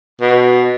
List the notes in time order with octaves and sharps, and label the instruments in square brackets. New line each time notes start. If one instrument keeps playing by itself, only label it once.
[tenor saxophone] B2